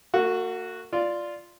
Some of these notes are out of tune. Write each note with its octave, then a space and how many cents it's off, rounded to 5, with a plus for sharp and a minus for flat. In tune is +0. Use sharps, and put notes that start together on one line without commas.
A#3 -45 F#4 -5
F4 -5 D5 +0